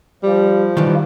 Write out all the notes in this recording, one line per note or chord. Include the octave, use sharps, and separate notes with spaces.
F3 G3
D#3 E3 G3 D#4